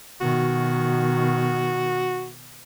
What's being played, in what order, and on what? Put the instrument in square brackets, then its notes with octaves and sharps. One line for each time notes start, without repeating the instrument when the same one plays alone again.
[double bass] B2 D#3 [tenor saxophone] F#4